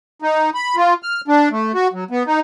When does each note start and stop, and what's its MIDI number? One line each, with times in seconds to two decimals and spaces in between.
0.22 0.50 63
0.54 0.76 83
0.76 0.94 65
1.03 1.21 89
1.28 1.49 62
1.51 1.72 57
1.74 1.88 66
1.93 2.04 54
2.10 2.23 59
2.27 2.40 63